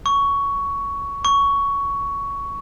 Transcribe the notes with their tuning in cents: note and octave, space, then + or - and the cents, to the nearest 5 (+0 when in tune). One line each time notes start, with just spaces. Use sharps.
C#6 +15
C#6 +15